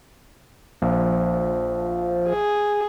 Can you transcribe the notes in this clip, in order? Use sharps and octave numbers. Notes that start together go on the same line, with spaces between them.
A#1 F3
G#4